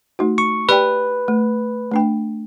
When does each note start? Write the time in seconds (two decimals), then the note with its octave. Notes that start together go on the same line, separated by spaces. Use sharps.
0.19 A3 D#4 F#4
0.38 C#6
0.69 G4 B4 D5 G5
1.28 A3
1.91 A3 D4 G5